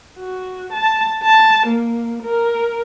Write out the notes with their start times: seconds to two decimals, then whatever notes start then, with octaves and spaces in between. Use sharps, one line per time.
0.18 F#4
0.73 A5
1.23 A5
1.66 A#3
2.23 A#4